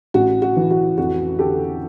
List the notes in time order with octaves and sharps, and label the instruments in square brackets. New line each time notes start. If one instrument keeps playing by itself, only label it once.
[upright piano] A1 F#4
F#4
E3
F#4
F2 F#4
D3 G4 A4